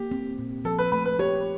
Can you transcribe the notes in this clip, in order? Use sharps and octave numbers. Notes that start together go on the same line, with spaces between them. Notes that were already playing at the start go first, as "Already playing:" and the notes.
Already playing: A#3 G4
C4
A#2
F3 A4
B4
A3 B4
B4
G4 C#5